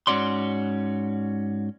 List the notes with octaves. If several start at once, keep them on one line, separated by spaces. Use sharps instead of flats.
G#2 C#4 F#4 D5 C6